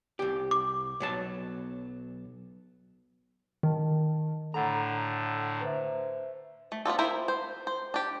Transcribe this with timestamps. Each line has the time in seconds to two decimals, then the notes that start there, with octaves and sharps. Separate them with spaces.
0.19 C2 G4
0.51 D6
1.00 B1 F#3 A5
3.63 D#3 D#5 A5
4.54 A2 D3 A4 F#5 A#5 B5
5.61 B4 C5 E5
6.72 A3
6.85 B3 D4 F4 A4
6.99 E4 F4 A#4 C5 E5
7.28 C5
7.67 C5
7.94 D4 G4